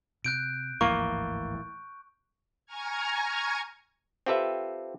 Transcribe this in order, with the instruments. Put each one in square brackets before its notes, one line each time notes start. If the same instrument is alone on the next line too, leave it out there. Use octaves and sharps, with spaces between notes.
[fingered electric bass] C3 [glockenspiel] F#6 G6 D7
[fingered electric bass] D1 G#1 F3 [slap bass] A2 E3 [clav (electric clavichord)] A#3 [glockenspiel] C#6
[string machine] G#5 A#5 C#6 F6 G#6
[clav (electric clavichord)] C4 F4 G4 A4 B4 E5